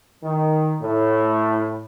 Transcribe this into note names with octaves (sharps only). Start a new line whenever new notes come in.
D#3
A2